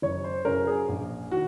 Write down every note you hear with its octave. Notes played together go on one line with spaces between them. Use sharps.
F#1 C#5
C5
F#2 C#3 A#4
G#4
A#1
D#3 F#4